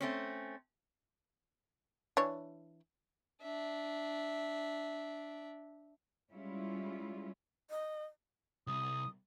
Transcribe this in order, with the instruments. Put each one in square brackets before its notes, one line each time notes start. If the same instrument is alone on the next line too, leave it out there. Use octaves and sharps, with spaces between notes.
[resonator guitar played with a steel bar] A3 C4 C#4
[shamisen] E3 D4 C#5
[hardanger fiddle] D4 E5
[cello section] G3 G#3 C#4 E4 F4
[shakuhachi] D#5
[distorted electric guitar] C2 C3 [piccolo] D#6